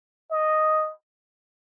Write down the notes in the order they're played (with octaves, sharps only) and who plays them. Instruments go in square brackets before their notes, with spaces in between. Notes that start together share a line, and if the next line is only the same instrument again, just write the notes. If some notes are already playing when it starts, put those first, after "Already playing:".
[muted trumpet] D#5